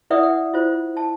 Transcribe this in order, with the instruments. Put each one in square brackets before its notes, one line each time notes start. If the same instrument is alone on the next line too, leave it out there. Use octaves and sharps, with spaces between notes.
[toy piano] E4 B4 D5 E5 F#5 D#6
F#5
E4 F4 C5
A5